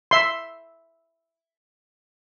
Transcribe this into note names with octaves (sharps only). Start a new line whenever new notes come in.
E5 C6